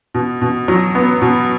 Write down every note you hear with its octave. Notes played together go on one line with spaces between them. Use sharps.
B2
B2
F#3
B3
B2